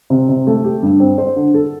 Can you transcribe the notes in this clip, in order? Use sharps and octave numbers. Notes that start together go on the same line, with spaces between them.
C3
C3
A3
G4
G2
C4
C5
D3
A4